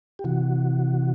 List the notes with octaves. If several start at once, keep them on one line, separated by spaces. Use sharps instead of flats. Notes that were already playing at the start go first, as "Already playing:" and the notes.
G4
C3 E3 F#4